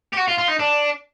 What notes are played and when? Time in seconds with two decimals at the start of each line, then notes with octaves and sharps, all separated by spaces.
0.13 G4
0.17 F#4
0.28 F4
0.38 F4
0.48 D#4
0.59 D4